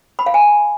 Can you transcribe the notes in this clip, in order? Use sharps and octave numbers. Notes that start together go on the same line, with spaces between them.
B5
F5
G#5